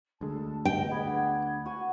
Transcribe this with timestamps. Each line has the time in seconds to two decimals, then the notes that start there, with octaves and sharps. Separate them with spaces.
0.21 D2 G#3 A4 A5
0.65 D#5 G5
0.91 B3 D4 G#4 G#6
1.66 F#4 G#5